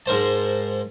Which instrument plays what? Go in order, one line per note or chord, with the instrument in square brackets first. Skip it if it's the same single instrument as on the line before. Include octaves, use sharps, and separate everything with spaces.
[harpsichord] G#2 A#4 C5 A5